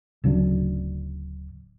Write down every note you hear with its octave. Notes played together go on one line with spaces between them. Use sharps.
D1 C#3 F#3 D4